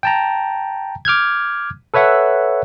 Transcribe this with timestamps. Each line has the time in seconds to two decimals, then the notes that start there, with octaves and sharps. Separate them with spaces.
0.03 G5 A5 A#5
1.05 D6 F6 G6 G#6
1.94 A4 B4 C#5 E5 F#5